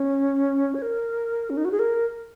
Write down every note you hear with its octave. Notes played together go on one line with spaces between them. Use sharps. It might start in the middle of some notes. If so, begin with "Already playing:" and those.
Already playing: C#4
C#5
A#4
C#4
D#4
F#4
G#4
A#4